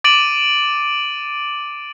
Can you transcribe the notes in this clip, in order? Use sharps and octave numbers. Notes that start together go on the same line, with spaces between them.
D6 A6 D7 D#7 F#7